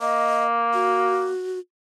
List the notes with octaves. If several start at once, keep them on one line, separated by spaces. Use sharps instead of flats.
A#3 D#5
F#4